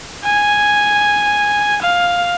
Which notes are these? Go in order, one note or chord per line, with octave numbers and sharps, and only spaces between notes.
G#5
F5